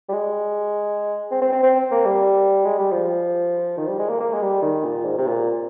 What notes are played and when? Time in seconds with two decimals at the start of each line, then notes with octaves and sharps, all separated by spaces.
0.09 G3
0.13 G#3
1.31 C4
1.42 C4
1.52 C4
1.63 C4
1.91 A#3
2.05 G3
2.65 G#3
2.79 G3
2.91 F3
3.77 D#3
3.88 G3
3.99 G#3
4.09 A#3
4.20 A#3
4.33 G#3
4.42 G3
4.62 D#3
4.84 A#2
5.05 G#2
5.18 C3
5.27 A#2